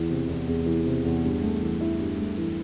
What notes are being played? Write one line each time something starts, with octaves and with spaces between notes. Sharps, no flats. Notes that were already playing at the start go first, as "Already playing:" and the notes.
Already playing: E2 E3
C3
E2
E2
E3
C3
E2
G2
A3
E3
E4
G2
A3
E3